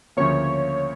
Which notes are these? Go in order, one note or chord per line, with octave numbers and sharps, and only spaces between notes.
D2 C#3 F3 A#3 C#5